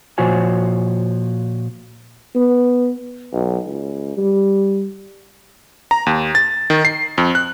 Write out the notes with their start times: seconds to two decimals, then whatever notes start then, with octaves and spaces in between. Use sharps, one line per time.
0.18 A#2 F3 F#4 C5 C#5 G#5
2.35 B3
3.33 B1
3.67 C#2
4.17 G3
5.91 A#5
6.06 D#2
6.35 A6
6.70 D#3
6.85 C7
7.18 F2
7.35 F#6